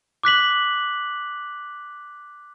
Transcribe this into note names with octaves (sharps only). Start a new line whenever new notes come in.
D6 F#6 B6 F#7